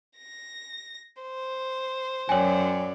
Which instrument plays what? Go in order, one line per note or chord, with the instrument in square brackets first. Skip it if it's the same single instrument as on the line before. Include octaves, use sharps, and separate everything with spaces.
[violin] A#6
C5
[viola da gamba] F#2 F#3 D5 [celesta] C#5 G5 G#5